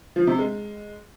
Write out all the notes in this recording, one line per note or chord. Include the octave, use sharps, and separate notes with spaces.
F3
C3
G#3